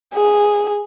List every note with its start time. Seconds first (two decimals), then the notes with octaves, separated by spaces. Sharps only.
0.14 G#4